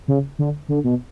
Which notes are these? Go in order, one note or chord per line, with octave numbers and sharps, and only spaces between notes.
C#3
D3
D3
B2